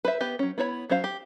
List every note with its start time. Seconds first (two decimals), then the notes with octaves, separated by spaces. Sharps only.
0.05 B4 C5 E5
0.20 B3 G4 B4
0.39 F#3 C#4
0.58 B3 E4 C#5 B5
0.90 F#3 C#4 C5 F5
1.04 G4